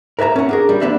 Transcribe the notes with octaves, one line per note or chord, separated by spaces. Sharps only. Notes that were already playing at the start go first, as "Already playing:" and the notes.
A#4 B4 E5 G#5 A#5
C#4 F#5
D4 G#4 A#4
G3
A3 B3 D4 B4 E5